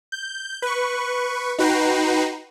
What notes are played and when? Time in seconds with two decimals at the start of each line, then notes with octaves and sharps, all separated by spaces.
0.12 G6
0.62 B4 C#6
1.59 D#4 F#4 B4 G5 A#5 C7